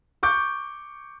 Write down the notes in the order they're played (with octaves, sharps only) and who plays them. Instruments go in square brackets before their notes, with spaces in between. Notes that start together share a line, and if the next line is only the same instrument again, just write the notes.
[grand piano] C#6 D6 G6